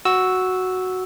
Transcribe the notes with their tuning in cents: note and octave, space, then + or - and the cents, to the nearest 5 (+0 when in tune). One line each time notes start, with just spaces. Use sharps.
F#4 +0 E6 -10